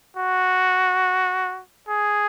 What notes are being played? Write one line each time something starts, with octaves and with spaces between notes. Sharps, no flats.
F#4
G#4